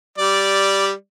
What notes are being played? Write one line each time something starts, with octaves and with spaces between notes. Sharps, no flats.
G3 D5